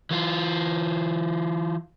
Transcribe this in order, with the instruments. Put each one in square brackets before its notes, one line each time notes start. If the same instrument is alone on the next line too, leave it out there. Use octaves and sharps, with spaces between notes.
[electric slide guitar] E3 F4